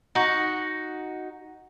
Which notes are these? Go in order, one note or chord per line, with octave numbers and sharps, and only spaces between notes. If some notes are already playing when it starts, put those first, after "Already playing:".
D#4 F#4